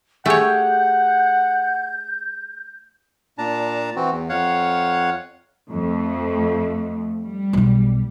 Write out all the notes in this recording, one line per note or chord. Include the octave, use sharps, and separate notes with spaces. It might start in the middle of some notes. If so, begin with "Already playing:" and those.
A3 G4 G#4 C#5 F#5 G6
A#2 D4 A5 A#5
E3 C4 F#4
E2
F2 C#5 F5 F#5
F2 A3
G3
B1 B2